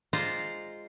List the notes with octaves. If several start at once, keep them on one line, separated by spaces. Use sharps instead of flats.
G#3 F4 C5 D5 A#5